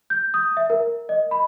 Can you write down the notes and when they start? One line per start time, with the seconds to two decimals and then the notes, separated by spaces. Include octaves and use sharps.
0.10 G6
0.34 D#6
0.57 E5
0.70 A#4
1.09 D#5
1.31 B5